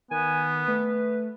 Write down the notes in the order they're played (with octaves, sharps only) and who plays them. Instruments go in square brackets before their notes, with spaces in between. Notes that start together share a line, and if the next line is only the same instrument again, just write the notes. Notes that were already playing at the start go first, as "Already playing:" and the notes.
[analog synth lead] D#3 [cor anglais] B3 [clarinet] G#5
[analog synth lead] A3 [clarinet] B4